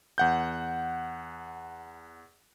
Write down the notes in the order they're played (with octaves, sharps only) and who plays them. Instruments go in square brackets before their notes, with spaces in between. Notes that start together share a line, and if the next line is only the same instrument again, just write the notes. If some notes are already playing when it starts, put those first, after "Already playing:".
[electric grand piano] E2 F#5 G6